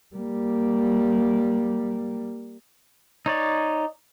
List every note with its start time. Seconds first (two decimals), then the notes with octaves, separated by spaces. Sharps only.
0.16 G3 A#3
3.26 D#4 C#5 D5